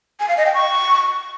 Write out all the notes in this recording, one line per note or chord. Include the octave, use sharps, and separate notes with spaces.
G#5
F5
D#5
G5
C#6